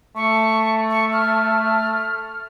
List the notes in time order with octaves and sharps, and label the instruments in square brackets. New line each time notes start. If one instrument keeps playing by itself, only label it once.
[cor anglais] A3 [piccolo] C#6
[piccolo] C#6
F6